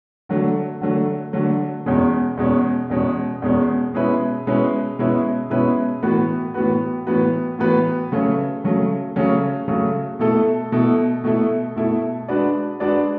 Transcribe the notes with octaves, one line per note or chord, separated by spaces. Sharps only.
D3 F#3 A3
D3 F#3 A3
D3 F#3 A3
E2 B2 G#3 C#4
E2 B2 G#3 C#4
E2 B2 G#3 C#4
E2 B2 G#3 C#4
B2 G#3 C#4 E4 B4
B2 G#3 C#4 E4 B4
B2 G#3 C#4 E4 B4
B2 G#3 C#4 E4 B4
A2 E3 B3 F#4 B4
A2 E3 B3 F#4 B4
A2 E3 B3 F#4 B4
A2 E3 B3 F#4 B4
C#3 F#3 A3 C#4
C#3 F#3 A3 C#4
C#3 F#3 A3 C#4
C#3 F#3 A3 C#4
B2 A3 E4 A4
B2 A3 E4 A4
B2 A3 E4 A4
B2 A3 E4 A4
G#3 D4 F#4 B4 D5
G#3 D4 F#4 B4 D5